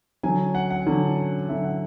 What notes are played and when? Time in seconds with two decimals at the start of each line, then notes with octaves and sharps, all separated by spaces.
0.23 D3 F#3 C#4 G#5
0.55 F#5
0.70 F#5
0.86 D3 F#3 C#4
1.48 D3 F#3 C#4 E5
1.64 F#5